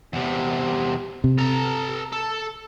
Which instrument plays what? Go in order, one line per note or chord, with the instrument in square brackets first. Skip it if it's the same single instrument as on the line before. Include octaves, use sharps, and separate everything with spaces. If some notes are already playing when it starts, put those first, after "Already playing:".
[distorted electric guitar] E2 C3
[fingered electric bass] C3
[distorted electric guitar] A4 A#5
A4